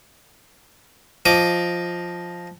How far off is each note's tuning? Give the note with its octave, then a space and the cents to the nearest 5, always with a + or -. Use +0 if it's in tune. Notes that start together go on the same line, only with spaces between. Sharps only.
F3 +0 D#5 +0 D6 +0